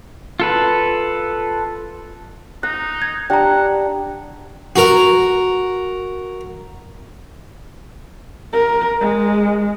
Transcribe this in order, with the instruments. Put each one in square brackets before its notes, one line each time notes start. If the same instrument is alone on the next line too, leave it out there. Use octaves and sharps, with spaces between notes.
[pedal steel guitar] F4 A4 B4
[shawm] D#4 [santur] D#6 [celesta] F#6
[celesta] G#6
[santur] D4 G4 [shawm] F#5 [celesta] G5 A#5
[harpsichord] F#4 A#4
[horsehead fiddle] A#4
G#3